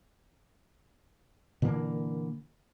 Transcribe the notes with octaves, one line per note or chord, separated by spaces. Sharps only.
A#2 D3 E3 A#3